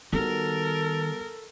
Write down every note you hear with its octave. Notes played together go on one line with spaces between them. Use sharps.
D#3 G3 B3 F#4 A4 A#4